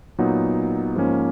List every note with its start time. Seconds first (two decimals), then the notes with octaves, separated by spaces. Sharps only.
0.18 A#2 F#3 B3 D#4
0.95 G#2 F3 A#3 C#4